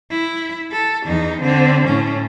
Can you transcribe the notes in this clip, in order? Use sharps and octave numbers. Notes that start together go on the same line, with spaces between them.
E4
A4
E2 D#4
D3 C4
A2 C#4